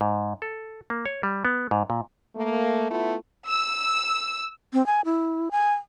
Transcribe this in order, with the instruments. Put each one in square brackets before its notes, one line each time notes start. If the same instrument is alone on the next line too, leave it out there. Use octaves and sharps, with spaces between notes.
[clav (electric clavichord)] G#2
A4
A#3
C#5
G3
B3
G#2
A#2
[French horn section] A3 A#3
A3 B3 E4 F4
[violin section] E6
[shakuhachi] C4
G#5
E4
G#5